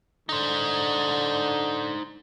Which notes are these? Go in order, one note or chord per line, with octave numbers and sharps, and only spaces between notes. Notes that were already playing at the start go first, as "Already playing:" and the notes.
D3 D#4 C5